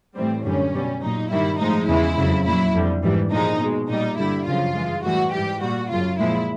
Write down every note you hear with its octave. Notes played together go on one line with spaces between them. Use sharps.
A2 E3 G3 C4
F#2 D3 G3 C#4
B2 G3
A#2 F#3 D#4
G2 D#3 G3 E4
A2 F3 G#3 D#4
E2 C#3 E3 G#3 E4
F2 C#3 F#3
A#2 F#3 E4
F2 D3 G3
G#2 E3 G3
A#2 F3 G#3 D#4
B2 G#3
A#2 G3 D#4
G2 D3 G3 E4
F#2 C#3 F3 F4
G2 E3 G#3
A2 E3 G3 F#4
G#2 E3 G3 G4
A#2 G3 F#4
F#2 C#3 F#3 F4
A#2 F3 G#3 E4